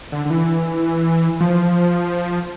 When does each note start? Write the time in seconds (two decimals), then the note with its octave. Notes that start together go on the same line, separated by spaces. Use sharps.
0.12 D3
0.25 D3
0.30 E3
1.41 F3